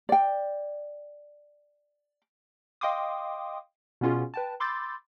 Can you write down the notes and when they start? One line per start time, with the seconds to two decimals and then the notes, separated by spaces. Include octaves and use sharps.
0.09 D5 G5
2.81 D#5 F5 G5 C6 D6 D#6
4.01 B2 B3 C#4 F4 G#4
4.34 B4 G5 A5
4.60 B5 C6 D6 E6 G6 A6